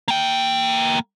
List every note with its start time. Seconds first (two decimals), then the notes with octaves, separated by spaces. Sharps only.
0.08 A#3 G5